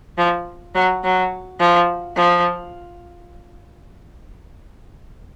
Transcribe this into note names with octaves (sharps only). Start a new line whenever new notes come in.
F3
F#3
F#3
F3
F3